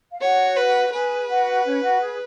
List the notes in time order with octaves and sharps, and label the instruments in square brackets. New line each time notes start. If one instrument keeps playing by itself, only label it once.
[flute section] F5
[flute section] F#4 F#5 [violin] C#5
[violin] B4
[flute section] G#4 G#5 [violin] B4
[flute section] F#4 F#5
C#4 C#5
F#4 F#5
G#4